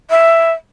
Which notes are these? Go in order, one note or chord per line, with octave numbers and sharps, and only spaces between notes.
E5